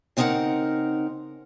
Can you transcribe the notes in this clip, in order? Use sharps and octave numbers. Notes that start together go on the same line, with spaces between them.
C#3 C4 D#4 A4 A#4 F#5